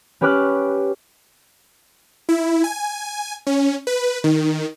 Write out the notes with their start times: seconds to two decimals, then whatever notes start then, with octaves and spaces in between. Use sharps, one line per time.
0.21 C#4 G4 B4 D6 F6 F#6
2.29 E4
2.64 G#5
3.47 C#4
3.87 B4
4.24 D#3